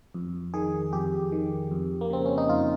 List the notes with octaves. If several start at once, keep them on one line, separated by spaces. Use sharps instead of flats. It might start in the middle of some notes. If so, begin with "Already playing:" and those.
F2
D#3 G#4
F2 G4
D#3
F2
A#3
C#3 C4
C#4
D#4
F2 F4